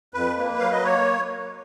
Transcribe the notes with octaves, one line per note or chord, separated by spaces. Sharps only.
F2 B4
A#3
F#3 F5
D#5
A#3 C#5